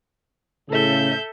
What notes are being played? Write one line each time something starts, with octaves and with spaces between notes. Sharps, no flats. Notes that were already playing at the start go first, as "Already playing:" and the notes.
A2 C#3 A4 E5 G6